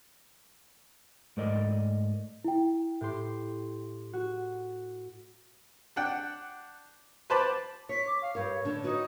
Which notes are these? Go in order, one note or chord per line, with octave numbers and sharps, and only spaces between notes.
G#2 A3 A#4 D5 D#5
E4 G5
A2 G4 C6
F#4
D4 F#5 G5
B4 C5 A5 B5 D6
C#5 B6
D6
F5
G2 A#4 C#5
A2 D3 D4
D#4 F#4 B4 C#5